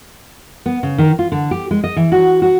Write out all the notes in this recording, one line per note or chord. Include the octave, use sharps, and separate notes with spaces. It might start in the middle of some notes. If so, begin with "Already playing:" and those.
B3
C#3
D#3
F4
D3
G4
G#3
D#5
E3
F#4
F#4